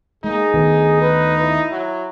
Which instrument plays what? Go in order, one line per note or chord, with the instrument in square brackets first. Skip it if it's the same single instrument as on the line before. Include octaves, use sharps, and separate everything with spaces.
[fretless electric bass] G#3 A#3 [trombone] D#4 [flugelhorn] G#4
[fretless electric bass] D2 D#3 B3
[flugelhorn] B4
E4
[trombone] F#3